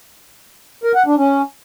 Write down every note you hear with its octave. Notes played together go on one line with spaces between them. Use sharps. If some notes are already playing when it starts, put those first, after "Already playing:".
A#4
F#5
D4
C#4